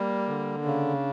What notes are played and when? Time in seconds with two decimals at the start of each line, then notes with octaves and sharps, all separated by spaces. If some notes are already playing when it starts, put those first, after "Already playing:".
Already playing: G3 A#3
0.29 D3
0.65 C#3 D4